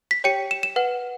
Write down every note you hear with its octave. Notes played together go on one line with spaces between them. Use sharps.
B6
G4 C#5 G5 C#7
E7
E7
B4 F#5